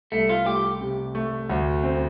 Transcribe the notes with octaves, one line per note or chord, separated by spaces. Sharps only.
C2 A3
F4
A3 G4
C3
A3
D2
C4